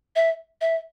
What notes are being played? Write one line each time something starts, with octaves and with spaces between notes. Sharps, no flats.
E5
E5